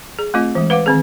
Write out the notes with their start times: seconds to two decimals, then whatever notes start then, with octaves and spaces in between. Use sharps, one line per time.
0.19 G#4
0.34 A3 C4 F4 D#5
0.55 E3 G#3
0.70 B4 F5 F#5 D6
0.86 D#3 C4 G#4